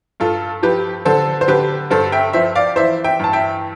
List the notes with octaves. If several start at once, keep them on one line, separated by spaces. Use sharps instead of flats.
G2 F4 A4
F3 G4 B4
D3 A4 C5
C5
D3 G4 B4
G2 A4 C5
E5 G5
F3 C5 E5
D5 F5
E3 C5 E5
E5 G5
G2 A5
E5 G5